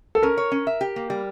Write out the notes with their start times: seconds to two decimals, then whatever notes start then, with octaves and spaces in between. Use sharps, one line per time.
0.15 A4
0.23 C#4 A#4
0.37 C#5
0.52 C#4
0.67 E5
0.81 G4
0.96 A#3
1.10 G3